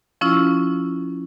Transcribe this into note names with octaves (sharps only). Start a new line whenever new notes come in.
F3 C#4 E4 F4